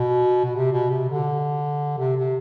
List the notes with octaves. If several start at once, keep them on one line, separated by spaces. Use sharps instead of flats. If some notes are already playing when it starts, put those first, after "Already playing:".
Already playing: B2
B2
C3
B2
C3
D3
C3
C3